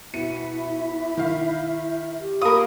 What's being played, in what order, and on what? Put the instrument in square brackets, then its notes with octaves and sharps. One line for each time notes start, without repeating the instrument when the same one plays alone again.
[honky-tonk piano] B2 C#7 D#7 [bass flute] E4 [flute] E5
[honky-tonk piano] D#3 F5
[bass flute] G4
[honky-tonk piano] A#3 F4 [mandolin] A#4 D#6 [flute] B5